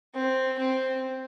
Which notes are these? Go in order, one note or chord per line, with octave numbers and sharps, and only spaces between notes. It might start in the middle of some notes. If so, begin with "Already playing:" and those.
C4
C4